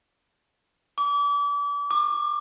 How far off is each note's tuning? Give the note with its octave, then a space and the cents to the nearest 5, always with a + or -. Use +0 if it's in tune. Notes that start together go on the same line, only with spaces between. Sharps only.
D6 -35
D6 +30